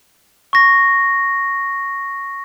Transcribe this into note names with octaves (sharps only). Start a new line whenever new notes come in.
C#6 A#6